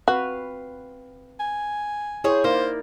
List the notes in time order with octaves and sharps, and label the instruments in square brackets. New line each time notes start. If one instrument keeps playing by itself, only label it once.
[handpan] C4 B4 F5 [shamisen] F#4
[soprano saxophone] G#5
[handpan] E4 C5 [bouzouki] G#4 C#5
[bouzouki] A#3 [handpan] D#4 A#4 D5 [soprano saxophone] C5